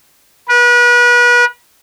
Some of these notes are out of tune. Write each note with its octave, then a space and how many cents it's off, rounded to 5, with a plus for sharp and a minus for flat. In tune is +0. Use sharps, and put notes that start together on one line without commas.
B4 -35